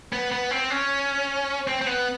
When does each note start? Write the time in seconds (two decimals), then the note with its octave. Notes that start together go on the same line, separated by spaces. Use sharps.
0.13 B3
0.32 B3
0.51 C4
0.70 C#4
1.67 C4
1.82 C4
1.87 B3